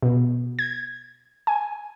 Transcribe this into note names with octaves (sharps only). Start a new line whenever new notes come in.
B2
G#6
G#5